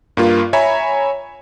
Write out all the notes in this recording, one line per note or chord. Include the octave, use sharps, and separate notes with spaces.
G2 A#3 F4
C#5 E5 G#5 A#5 B5